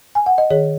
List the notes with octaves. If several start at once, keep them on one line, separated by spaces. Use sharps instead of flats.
G#5
F#5
D#5
D#3 G#4 C#5